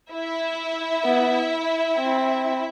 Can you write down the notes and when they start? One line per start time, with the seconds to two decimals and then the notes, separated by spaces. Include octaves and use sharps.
0.12 E4 E5
1.05 B3
1.98 C4